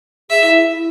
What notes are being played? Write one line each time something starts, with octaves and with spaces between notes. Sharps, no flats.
G#4 E5
E4
E4